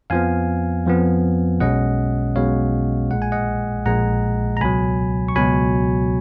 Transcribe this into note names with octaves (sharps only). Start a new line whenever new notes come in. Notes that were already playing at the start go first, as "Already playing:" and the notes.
F2 F3 B3 F5 G#5
F2 F3 B3
B1 B2 G#3 C#4 D#5 F#5
B1 B2 G#3 C#4 C#5 F5
A#1 A#2 G#3 F#5
G#5
D#5 F#5
A#1 A#2 G#3 F#5 A#5
A#5
C#2 B2 F#3 G#5 B5
C#6
C#2 B2 F#3 G#5 B5